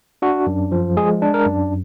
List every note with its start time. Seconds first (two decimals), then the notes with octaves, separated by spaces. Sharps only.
0.22 D4 F#4
0.47 F#2
0.72 F3
0.97 G#3 G#4
1.22 D4
1.34 A#4
1.46 F#2